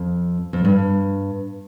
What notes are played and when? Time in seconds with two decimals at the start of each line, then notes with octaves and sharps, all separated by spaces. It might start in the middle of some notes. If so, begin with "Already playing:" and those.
Already playing: F2
0.53 F2
0.65 G2